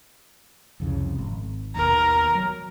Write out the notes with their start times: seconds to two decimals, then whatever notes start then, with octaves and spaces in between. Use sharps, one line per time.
0.80 C2 F2 C#3
1.19 G#1
1.76 D#2 B2 A#4
2.35 F#3